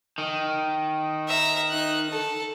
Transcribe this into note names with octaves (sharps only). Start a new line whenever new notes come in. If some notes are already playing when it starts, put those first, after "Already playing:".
D#3
E5 A#5
D#4 F#6
A4